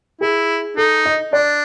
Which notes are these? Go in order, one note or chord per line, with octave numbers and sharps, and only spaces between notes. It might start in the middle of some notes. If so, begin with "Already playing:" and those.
E4 G#4
D#4 A4
D#5
D4 D5